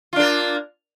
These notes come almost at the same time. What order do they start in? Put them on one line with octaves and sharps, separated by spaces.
F4 D4 A#3